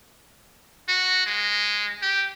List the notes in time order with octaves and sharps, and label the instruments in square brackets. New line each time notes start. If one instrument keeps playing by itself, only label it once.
[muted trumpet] F#4
G#3
G4